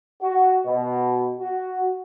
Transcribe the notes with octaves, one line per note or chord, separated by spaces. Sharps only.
F#4
B2
F#4